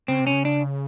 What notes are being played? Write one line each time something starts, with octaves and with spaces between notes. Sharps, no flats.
C#3 C4
C3
C#4
C#3
D4